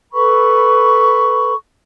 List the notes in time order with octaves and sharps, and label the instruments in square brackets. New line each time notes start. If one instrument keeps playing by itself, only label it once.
[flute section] A4 B4 B5 C#6